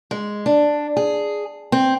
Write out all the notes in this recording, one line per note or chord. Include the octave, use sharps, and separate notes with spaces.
G#3
D4
G#4
C4